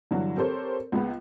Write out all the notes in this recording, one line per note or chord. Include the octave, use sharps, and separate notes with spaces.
G2 D3 E3 F#3
C4 G4 A4 A#4 C5 C#5
C#2 G#3 B3